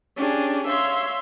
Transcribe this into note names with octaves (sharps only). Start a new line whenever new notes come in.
C#4 D4 G4 G#4
C#5 E5 F5 C6